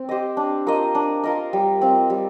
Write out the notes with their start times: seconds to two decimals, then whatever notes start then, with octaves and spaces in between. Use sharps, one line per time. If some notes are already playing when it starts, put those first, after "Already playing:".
Already playing: C4
0.09 G4 C5 D#5
0.37 D4
0.67 F4 A#4 D#5
0.95 D4
1.24 F4 A#4 D#5
1.53 G3
1.81 C4 F4
2.10 G3